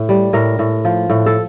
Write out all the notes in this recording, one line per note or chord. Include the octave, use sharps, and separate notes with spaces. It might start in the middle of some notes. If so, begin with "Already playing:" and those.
Already playing: A2
G3
A2 A#4
A2
F3
A2
A4